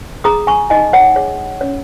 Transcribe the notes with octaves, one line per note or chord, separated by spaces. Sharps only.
G#4 A#5 D#6
G#5 C#6
D#4 D#5 G#5
C#5 F#5
G#4 C#5
C#4 C#5